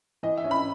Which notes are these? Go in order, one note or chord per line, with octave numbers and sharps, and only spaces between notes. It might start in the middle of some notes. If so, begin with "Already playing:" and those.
E3 D#5
E5
C#4
B5